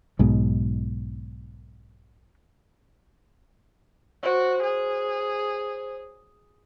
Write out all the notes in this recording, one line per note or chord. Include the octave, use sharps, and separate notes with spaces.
B1 G#2 B2
F#4 C5 C#5
G#4